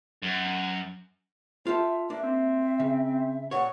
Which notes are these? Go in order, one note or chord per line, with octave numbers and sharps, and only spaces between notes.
F#2
F4 G4 A4 E5
A#3 D4 E5
C4
C#3
A#2 C#5 F#5 C#6